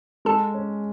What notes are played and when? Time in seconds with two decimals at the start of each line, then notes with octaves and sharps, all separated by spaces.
0.25 G#3 A4 A5
0.54 C#4